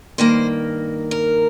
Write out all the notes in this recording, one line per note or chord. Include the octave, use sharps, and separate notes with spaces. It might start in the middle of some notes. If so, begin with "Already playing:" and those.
G2 D#3 A#3 C5
A#4